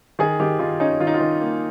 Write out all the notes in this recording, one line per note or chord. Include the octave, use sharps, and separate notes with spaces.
D#3 G#4
D#3 G4
D#3 F4
C#4 D#4
D#3 F4
D#4
F4
D#3
A#3